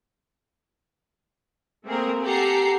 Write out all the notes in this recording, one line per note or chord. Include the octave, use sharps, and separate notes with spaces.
A3 A#3 C4 G#4 A#4
G4 A4 F#5 G#5 A#5 C7